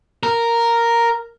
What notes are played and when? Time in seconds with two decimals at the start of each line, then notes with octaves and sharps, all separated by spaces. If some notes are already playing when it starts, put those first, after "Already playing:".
0.23 A#4